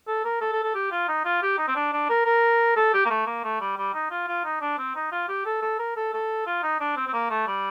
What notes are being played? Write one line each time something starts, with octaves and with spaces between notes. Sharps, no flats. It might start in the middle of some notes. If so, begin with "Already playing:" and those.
A4
A#4
A4
A4
A4
G4
F4
D#4
F4
G4
D#4
C4
D4
D4
A#4
A#4
A4
G4
A#3
A3
A#3
A3
G3
G3
D#4
F4
F4
D#4
D4
C4
D#4
F4
G4
A4
A4
A#4
A4
A4
F4
D#4
D4
C4
C4
A#3
A3
G3